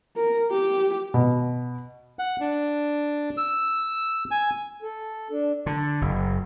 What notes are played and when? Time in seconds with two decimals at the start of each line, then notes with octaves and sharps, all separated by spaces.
0.16 A#4
0.51 G4
1.14 B2
2.19 F#5
2.41 D4
3.37 E6
4.31 G#5
4.82 A4
5.31 D4
5.66 D3
6.01 F#1